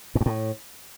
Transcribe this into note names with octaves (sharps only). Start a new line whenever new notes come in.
G#2
G2
A2